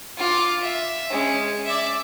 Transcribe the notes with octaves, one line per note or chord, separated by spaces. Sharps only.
F4 D6
E5
G#3 C#4
D5 E5